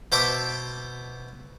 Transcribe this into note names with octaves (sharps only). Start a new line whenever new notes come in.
B2 C5 E5 A5 D6